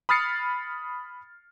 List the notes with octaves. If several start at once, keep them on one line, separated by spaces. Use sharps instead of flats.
B5 D#6 F6 A6 C7 C#7